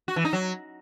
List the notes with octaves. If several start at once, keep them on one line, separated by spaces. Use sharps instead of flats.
F#4
E3
D#4
F#3